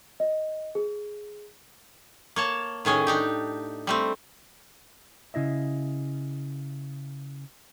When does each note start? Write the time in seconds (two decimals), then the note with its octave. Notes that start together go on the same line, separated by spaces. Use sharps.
0.20 D#5
0.75 G#4
2.36 A#3 C#5 A5
2.85 A2 D#3 C#4 G#4
3.07 D4 D#4 G4
3.87 G3 A3 C4
5.34 C#3 E4 D#5 E5